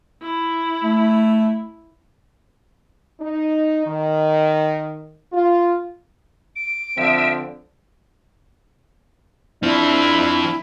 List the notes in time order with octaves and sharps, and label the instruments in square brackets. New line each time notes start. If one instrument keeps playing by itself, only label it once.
[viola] E4
[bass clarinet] A3
[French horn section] D#4
D#3
F4
[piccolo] D7
[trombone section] D3 F3 C4 [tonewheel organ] E5
[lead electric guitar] F3 C4 [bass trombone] D4 [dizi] E4